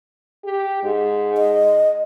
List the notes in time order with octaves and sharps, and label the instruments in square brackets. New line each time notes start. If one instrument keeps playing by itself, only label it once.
[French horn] G4
G#2
[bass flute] D#5